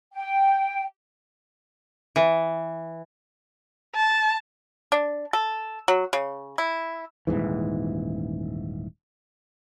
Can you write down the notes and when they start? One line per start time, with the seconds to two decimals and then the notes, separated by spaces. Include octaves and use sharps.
0.14 G5
2.16 E3
3.95 A5
4.92 D4
5.33 A4
5.88 F#3
6.13 C#3
6.58 E4
7.27 D#1 G#1 G#2 E3